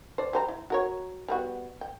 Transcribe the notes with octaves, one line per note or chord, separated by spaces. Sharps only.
C5 D5
G3 C5 A#5
E4
F#4 A#4 C#5
G3 B3 F#4
G5